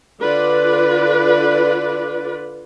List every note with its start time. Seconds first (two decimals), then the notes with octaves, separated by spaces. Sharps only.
0.22 D3 F4 B4 D5